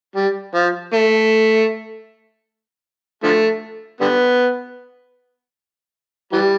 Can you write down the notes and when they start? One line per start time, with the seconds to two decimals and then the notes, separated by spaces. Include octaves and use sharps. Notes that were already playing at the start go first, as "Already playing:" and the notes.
0.16 G3
0.54 F3
0.93 A3
3.24 D3 F3 A3
4.01 D3 G3 B3
6.33 E3 G3